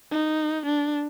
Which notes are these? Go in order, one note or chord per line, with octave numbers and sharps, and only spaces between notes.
D#4
D4